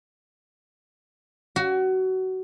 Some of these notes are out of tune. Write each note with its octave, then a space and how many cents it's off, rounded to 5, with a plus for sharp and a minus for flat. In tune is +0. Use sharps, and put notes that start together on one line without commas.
F#4 +25